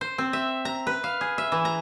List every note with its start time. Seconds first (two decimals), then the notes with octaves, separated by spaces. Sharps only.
0.01 C5
0.18 C4
0.33 E5
0.65 A#5
0.87 B4
1.04 F5
1.21 G#4
1.38 E5
1.52 E3
1.65 A#5